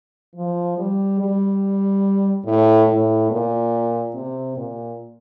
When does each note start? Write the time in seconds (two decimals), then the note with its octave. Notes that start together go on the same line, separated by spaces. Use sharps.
0.35 F3
0.78 G3
1.20 G3
2.45 A2
2.88 A2
3.31 A#2
4.14 C3
4.56 A#2